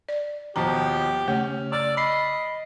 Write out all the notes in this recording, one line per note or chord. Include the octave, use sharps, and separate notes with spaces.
D5
D#2 B2 F3 G4 A#5
C#3 A3 C#4 G4
D5 E6 F6 A6
D#5 B5 C7